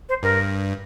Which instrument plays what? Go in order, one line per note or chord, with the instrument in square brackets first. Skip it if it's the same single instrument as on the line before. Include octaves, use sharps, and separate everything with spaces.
[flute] C5
[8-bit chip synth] G2 [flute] A#4